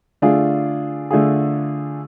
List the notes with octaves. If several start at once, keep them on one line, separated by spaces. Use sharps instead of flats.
D3 A3 D4 F4 G#4
D3 A3 D4 F4 G#4